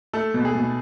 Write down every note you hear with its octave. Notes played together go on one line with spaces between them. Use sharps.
A3 A4
B2
G#4
B2